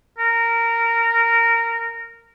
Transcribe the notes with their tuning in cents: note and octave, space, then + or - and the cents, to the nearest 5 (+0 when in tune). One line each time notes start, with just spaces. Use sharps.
A#4 -15